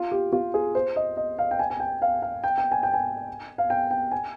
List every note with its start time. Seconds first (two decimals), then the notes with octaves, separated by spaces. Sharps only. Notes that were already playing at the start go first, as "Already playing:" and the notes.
Already playing: F4
0.12 G4
0.33 F4
0.54 G#4
0.75 C5
0.96 D#5
1.17 D#5
1.39 F5
1.51 G5
1.59 G#5
1.70 G#5
1.80 G5
2.02 F5
2.22 F5
2.44 G5
2.58 G5
2.72 G#5
2.83 G5
2.94 G#5
3.58 F5
3.70 G5
3.91 G5
4.12 G#5